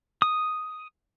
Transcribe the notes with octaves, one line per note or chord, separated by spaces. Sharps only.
D#6